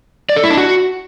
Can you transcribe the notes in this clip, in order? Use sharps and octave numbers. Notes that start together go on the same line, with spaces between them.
D5
A4
E4
D4
F#4